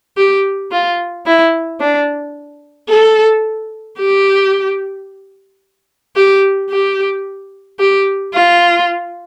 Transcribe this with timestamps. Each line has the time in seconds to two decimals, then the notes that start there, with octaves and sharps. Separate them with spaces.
0.17 G4
0.72 F4
1.26 E4
1.81 D4
2.89 A4
3.98 G4
6.16 G4
6.71 G4
7.79 G4
8.34 F4